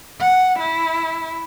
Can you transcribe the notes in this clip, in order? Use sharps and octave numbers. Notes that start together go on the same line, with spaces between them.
F#5
E4